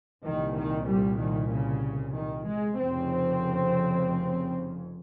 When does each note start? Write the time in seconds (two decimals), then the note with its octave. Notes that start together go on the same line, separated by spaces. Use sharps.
0.25 C2 A#2 D#3
0.56 D#3
0.87 G3
1.19 D#3
1.51 C#3
2.14 D#3
2.46 G#3
2.77 F1 F2 C#3 C4